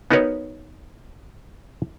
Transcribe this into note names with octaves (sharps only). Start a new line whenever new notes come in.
B3 D#4 F#4 A#4 B4 C#5